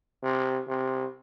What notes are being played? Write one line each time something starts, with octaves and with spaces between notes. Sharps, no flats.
C3
C3